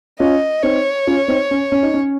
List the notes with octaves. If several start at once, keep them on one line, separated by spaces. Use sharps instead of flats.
C#4 F4 D#5
C4 D#4 C#5
C#4 F4
C4 D#4
C#4
C#4
D#4
C#4